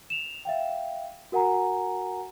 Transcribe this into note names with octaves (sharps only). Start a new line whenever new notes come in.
E7 F7
E5 F5 G5
F#4 A#4 F#5 G#5 A#5